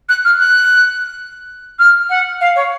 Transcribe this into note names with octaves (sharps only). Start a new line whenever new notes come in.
F#6
F6
F#6
F6
F#5
F5
C#5